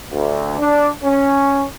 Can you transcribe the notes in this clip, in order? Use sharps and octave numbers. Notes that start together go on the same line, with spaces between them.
D2
D4
C#4